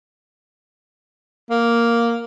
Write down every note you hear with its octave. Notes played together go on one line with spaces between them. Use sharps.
A#3